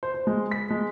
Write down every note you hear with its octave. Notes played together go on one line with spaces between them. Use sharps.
C5
C5
G#3
B6
G#3